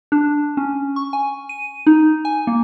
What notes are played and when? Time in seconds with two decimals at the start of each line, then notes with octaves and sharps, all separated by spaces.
0.12 D4
0.57 C#4
0.96 C#6
1.13 G#5
1.49 D#7
1.87 D#4
2.25 G#5
2.47 A#3